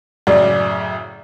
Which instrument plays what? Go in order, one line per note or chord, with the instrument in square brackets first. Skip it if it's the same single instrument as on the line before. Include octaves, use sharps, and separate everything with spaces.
[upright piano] F#2 A2 C#3 [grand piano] D5